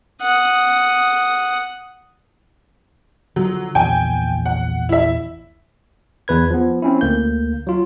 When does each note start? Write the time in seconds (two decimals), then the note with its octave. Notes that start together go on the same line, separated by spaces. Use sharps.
0.22 F#5 D#6
3.36 D3 F3 F#3
3.75 A#1 E2 G5 G#5
4.46 F#5
4.89 E4 E5
6.28 E2 B4 G#6
6.51 F3 B3
6.82 C4 C#4 E4
7.01 D2 A#3 G6
7.67 F#3 F4